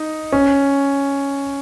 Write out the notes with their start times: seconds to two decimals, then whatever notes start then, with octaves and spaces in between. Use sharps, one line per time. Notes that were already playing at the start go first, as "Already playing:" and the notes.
Already playing: D#4
0.32 C#4